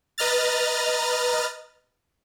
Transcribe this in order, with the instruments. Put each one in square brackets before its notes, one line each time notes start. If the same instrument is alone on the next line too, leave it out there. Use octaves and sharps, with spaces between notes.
[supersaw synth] B4 D#5 A#5 F6 A6